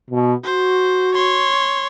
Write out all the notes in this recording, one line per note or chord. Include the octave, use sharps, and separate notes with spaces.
B2
F#4 C5
C#5 C6